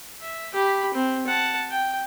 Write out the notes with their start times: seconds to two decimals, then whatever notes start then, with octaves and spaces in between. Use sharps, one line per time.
0.22 E5
0.53 G4 B5
0.94 C4
1.27 F#5 A5
1.71 G5